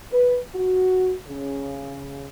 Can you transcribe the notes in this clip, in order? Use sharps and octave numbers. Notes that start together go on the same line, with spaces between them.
B4
F#4
C#3